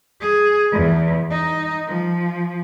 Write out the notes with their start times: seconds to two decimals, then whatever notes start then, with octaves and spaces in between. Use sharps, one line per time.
0.21 G#4
0.72 E2
1.30 D#4
1.87 F3